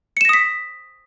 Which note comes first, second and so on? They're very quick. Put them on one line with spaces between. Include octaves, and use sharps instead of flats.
C#7 E7 A#6 D#6 B6